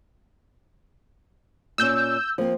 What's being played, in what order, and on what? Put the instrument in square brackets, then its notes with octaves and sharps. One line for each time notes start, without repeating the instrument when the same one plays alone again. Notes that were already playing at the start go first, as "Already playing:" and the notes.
[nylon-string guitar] A#2 C#4 [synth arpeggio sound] E6 G6
[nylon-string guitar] F3 A#3 C4